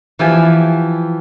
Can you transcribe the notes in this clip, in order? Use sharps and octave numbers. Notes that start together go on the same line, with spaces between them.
E3 F3 G4 G#5